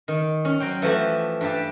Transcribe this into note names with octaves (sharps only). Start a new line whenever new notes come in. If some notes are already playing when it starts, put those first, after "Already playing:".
D#3
C#4
F#3 C5 G5
E3 F3 A3 F#4 G4
G2 G4 A5